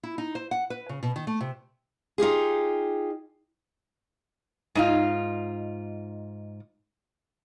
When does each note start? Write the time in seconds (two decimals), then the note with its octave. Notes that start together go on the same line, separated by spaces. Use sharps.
0.03 E4
0.18 D#4
0.35 C5
0.51 F#5
0.70 B4
0.89 C#3
1.03 B2
1.16 D#3
1.27 A3
1.41 C3
2.18 D#4 F4 G4 G#4
4.75 G#2 D#4 F4